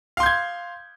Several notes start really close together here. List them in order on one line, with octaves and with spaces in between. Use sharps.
F5 C6 G6 G#6